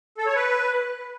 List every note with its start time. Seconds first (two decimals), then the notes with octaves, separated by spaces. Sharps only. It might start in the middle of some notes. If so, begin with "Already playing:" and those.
0.18 A4
0.26 C#5
0.35 B4